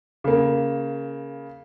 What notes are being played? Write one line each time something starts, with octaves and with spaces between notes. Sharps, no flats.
C#3 A#3